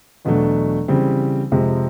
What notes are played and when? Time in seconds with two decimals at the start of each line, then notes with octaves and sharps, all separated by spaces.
0.25 E2 B2 F#3 A3 D4
0.88 C#3 E3 G3 C4
1.52 F2 C3 F3 G#3